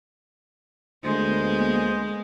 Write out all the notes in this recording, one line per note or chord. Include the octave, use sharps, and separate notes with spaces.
D2 G#3 A#3 B3 C5